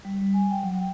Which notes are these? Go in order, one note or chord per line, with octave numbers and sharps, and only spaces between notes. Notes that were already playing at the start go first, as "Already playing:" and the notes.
G3
G3
G#5
G5
F#3
G5